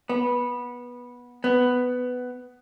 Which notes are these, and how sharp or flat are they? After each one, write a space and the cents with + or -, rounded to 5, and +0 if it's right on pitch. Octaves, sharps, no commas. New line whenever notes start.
B3 -15
B3 +10